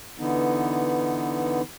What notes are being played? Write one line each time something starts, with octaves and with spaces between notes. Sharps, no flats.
D3 E3 B3 D#4